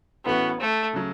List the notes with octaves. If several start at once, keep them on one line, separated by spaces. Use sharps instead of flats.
A2 E3 A3 B3 C#4 F#4
A3
C#3 F#3